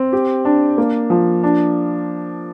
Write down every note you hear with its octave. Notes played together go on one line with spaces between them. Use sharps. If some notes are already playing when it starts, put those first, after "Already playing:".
Already playing: C4
G4
D4
A#3
F3
D4